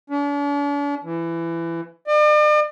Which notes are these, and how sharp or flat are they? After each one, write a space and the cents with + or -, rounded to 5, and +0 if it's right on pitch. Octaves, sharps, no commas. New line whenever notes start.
D4 -45
E3 +20
D5 +45